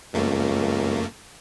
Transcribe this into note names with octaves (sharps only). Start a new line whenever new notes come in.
C#2 F#2 A3 A#3